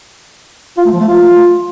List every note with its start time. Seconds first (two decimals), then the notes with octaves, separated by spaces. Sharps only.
0.78 F4
0.85 A3
0.93 F3
1.00 A3
1.08 F4